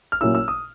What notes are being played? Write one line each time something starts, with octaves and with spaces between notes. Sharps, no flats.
F6
A#2 F#3 A#3 C#4 E4 E6
E6
D#6